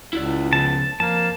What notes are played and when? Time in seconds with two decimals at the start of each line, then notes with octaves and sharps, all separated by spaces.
0.13 C#2 E4 F#4 D5
0.53 C#3 F3 B3 A5
1.00 F2 A#3 A5